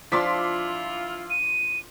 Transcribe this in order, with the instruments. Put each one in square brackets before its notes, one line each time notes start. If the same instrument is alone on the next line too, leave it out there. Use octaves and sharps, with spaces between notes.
[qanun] F3 D4 [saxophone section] E4 F4 [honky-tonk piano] C6 D6 B6
[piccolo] D#7